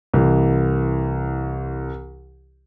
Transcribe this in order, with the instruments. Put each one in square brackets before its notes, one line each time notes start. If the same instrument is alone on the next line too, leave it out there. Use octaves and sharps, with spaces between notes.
[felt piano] C2 E3